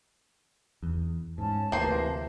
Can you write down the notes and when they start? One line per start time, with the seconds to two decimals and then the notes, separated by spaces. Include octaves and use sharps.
0.83 E2
1.38 G#2 C#4 A5
1.72 D2 C3 E3 A#3 C5